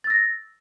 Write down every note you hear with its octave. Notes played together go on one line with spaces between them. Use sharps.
E6 A6 A#6